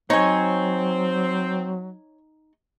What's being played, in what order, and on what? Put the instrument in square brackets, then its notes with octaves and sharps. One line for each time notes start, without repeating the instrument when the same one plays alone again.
[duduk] F#3 [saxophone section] C4 [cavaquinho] D#4 G#5 [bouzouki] C#5